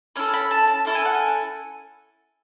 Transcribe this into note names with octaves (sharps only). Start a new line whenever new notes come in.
C#4 E4 A4 B5
B5
A5
A5
C#4 E4 A4 A5
G#5
F#5
G#5